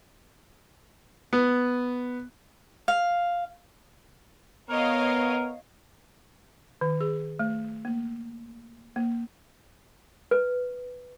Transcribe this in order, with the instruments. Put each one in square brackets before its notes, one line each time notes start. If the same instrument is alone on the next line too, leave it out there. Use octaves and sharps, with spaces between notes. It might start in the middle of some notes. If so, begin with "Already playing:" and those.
[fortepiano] B3
[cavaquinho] F5
[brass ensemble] B3 [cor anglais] A#4 [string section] C#5 D#5 F5
[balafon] D#3
G#4
A3
A#3
A#3
[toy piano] B4